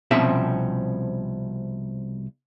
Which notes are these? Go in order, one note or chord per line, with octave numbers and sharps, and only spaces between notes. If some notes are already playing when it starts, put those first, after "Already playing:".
C2 B2 F3 C4 C#4 E5